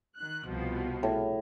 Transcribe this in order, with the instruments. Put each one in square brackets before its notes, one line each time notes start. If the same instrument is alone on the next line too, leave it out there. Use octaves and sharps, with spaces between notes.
[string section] D#3 F#6
C2 B2 F3
[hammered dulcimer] A2